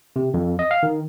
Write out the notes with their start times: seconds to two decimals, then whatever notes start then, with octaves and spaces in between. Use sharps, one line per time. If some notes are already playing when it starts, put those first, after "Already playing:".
0.16 C3
0.34 F2
0.59 D#5
0.71 F5
0.83 D#3